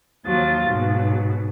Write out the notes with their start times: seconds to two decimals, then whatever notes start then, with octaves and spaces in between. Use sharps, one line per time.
0.25 D#2 F3 F#3 F4 A6
0.67 G#2 B2 F#3